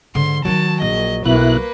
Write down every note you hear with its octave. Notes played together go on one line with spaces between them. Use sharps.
G#2 D3 C6
D#3 F#3 D#4 A5
A#1 D#5
B1 B2 A#3 E4 B4 F#6